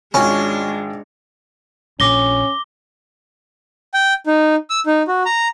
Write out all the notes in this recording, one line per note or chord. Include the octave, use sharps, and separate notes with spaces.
G#1 G#3 C#4 D4 F4
A#1 C#4 D6 A#6 G7
G5
D#4
E6
D#4
F#4
A#5